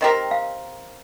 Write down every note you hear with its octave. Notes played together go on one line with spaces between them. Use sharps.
D#3 C4 G4 A#4 D#5
F5